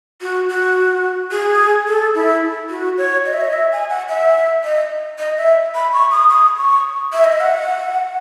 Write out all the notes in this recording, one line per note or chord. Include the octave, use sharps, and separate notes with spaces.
F#4
F#4
G#4
A4
E4
F#4
C#5
D#5
E5
D#5
E5
G#5
F#5
E5
D#5
D#5
E5
B5
C#6
D#6
D#6
C#6
E5
D#5
E5
F#5